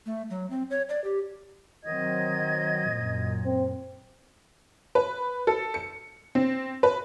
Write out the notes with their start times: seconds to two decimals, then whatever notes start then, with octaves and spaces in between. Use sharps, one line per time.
0.06 A3
0.30 F#3
0.50 C4
0.70 C#5
0.89 D5
1.04 G4
1.83 D#3 F#3 C4 D#5 G#6
2.88 F#2 A#2
3.45 C4
4.95 B4
5.47 A4
5.74 C#7
6.35 C4
6.83 B4